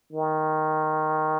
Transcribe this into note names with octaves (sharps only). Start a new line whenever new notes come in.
D#3